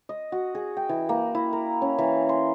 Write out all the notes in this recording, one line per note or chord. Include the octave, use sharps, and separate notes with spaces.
D#5
F#4
G#4
G5
E3
A#3
E4
A#4
C#4
E3
C6